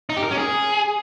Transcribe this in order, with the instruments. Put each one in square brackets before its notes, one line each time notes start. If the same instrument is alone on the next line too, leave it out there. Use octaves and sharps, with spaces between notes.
[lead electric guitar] D#4
G4
A#4
C#4
G#4